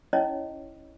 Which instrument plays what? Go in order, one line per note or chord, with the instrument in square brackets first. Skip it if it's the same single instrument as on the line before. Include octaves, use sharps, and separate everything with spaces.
[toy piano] C#4 D#4 E4 C#5 D#5